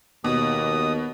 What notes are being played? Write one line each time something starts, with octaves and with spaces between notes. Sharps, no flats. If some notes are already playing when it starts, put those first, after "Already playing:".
D#2 B2 D#6